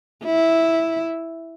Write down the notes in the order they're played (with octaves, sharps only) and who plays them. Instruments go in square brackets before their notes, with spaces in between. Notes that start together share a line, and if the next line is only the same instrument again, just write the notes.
[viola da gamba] E4